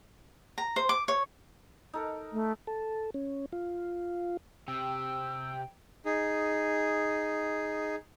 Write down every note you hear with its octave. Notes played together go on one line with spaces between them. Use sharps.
A#5
C5
D6
C#5
D#4 A4 A#4
A3
A4
C#4
F4
C3 G5 E6
D#4 G#4